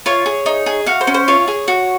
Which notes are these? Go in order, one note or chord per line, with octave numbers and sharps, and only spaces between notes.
F4 C#5
G#4
D#4
G#4
F#4 F5
C5
C#4
C5
F4 C#5
G#4
F#4